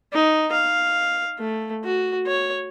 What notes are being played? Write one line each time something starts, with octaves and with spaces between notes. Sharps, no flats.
D#4
F5
A3
F#4
C#5